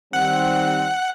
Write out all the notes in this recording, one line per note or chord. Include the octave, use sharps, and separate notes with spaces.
D#3 G3 C4 F#5